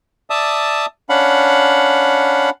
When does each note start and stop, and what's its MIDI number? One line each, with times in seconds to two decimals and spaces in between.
0.30 0.86 74
0.30 0.86 76
0.30 0.86 81
0.30 0.86 87
1.09 2.50 61
1.09 2.50 62
1.09 2.50 77
1.09 2.50 78
1.09 2.50 83